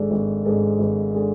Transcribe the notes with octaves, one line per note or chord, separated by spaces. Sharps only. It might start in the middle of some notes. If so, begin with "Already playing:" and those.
Already playing: G#1 G#2 G#3 D4 A4
G#1
G#2 G#3 D4 A4
G#1
G#3 D4 A4